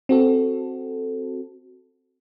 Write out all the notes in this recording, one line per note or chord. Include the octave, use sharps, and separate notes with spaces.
C4 F#4 A4